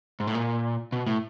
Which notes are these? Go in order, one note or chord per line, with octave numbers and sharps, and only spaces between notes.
G#2
A2
A#2
B2
A2